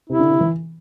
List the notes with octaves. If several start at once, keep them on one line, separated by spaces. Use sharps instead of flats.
C3 E4
D3
C3
E3